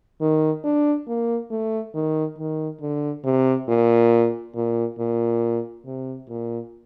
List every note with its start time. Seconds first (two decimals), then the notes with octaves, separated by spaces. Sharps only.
0.21 D#3
0.64 D4
1.08 A#3
1.51 A3
1.94 D#3
2.38 D#3
2.81 D3
3.25 C3
3.68 A#2
4.55 A#2
4.98 A#2
5.86 C3
6.29 A#2